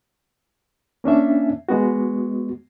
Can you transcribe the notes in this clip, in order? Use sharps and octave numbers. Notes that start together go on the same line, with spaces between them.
A#3 C#4 D4 E5
G#3 B3 F#4